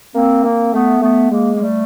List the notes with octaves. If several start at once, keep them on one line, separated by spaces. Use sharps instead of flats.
A#3 C4
A#3 C4
A3 B3
A3 B3
G#3 A#3
A#3
G3 A3